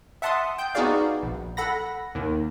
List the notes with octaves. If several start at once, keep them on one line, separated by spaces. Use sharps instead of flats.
E5 F#5 A5 C6 D#6
G5 G6
B3 D#4 F#4 G#4 D5 F5
A#1
A4 F#5 B5 A#6
D#2 D#3